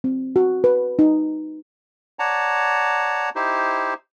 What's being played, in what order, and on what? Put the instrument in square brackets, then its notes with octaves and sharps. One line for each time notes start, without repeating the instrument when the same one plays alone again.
[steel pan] C4
F#4
B4
D#4
[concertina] C#5 D5 F#5 A5 A#5
D#4 E4 G4 C5